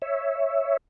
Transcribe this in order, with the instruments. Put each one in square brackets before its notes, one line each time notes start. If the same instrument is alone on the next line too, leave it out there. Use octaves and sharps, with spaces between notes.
[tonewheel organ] C#5 E5